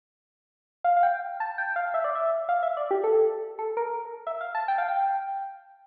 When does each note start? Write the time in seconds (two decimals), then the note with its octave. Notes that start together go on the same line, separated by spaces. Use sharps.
0.84 F5
0.97 F5
1.03 G5
1.40 A5
1.58 G5
1.76 F5
1.94 E5
2.04 D5
2.15 E5
2.49 F5
2.63 E5
2.77 D5
2.91 G4
3.04 A4
3.59 A4
3.77 A#4
4.27 E5
4.41 F5
4.55 A5
4.68 G5
4.78 F5
4.88 G5